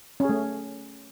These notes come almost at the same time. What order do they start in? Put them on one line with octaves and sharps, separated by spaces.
C#4 G#4 A3